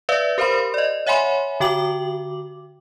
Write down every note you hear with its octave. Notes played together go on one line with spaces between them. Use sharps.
B4 D5 E5 F5 E6
G4 A#4 C5 F5 B5 C6
D5 D#5
C#5 E5 F#5 G#5 B5 C6
D3 F#4 G5 D6 F#7